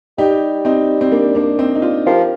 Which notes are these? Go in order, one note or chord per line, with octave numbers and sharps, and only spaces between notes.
G3 D#4 G4
C4 D#4
C4
A#3 D4
A#3 D4
C4 D#4
D#4
D4 F4
F3 G4 A#4